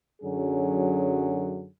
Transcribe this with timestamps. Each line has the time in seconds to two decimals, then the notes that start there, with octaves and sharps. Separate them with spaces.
0.22 F#2 D3 F#3 C#4 G#4